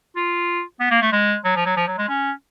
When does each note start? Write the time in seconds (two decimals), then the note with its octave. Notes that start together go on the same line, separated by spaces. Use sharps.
0.16 F4
0.80 B3
0.91 A#3
1.02 A3
1.12 G#3
1.45 F#3
1.56 F3
1.66 F#3
1.77 F3
1.88 F#3
1.98 G#3
2.09 C#4